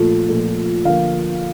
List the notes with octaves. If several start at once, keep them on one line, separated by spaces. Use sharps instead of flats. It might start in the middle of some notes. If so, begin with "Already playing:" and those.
Already playing: A#2 F3 A3
A#2 F3 A3
D3 F3 A#3 F5